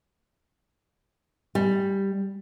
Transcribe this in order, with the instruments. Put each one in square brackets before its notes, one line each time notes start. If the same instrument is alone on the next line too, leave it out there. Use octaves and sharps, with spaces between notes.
[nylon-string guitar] G3